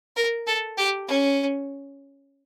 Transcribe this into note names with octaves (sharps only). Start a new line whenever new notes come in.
A#4
A4
G4
C#4